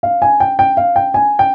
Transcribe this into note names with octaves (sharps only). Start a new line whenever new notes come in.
F5
G#5
G5
G5
F5
G5
G#5
G5